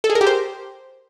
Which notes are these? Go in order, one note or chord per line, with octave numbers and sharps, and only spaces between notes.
A4
G#4
A#4
G4
C5